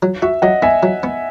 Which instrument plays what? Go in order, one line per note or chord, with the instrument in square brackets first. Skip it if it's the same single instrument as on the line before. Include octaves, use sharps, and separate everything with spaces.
[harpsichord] F#3
[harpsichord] F#4 [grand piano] E5
[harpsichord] F#3 [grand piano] D#5 F#5
[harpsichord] B3 [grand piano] E5 G#5
[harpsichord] F#3
B3